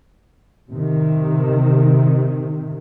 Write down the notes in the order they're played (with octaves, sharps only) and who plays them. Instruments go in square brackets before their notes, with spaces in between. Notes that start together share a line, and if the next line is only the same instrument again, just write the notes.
[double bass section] C3 D#3